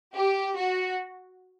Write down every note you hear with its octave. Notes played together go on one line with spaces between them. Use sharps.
G4
F#4